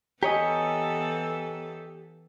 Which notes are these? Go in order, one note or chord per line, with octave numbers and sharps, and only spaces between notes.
E3 B3 G4 A4 C#5 D#5 G#5 A#5